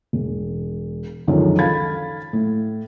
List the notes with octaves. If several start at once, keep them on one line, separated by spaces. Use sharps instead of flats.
E1
C#2 F#2 D3 D#3 F3
A4 F5 B5 G#6 A6
A2